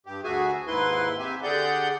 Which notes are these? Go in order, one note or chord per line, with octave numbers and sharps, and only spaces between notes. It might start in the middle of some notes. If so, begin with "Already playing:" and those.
G2 G4
D2 F#4 G#4 E5 G#5
D#2 G#2 E4 B4 C6
C4 G4 E5 G#5
D3 G4 G#4 D5 F#5 G6